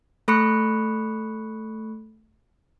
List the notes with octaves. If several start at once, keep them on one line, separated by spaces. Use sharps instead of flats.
A3 A4 B5 C#6 F#6 C#7